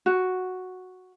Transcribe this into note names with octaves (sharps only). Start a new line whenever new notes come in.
F#4